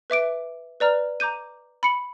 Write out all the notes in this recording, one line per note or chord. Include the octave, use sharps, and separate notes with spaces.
B4 E5 D6 D7
B4 D5 A#5 F6
A#5 D6 G6 D#7
B5 C#7 F#7